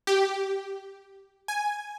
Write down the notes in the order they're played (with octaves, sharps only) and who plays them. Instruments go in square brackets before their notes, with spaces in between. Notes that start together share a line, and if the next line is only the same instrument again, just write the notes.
[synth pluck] G4
G#5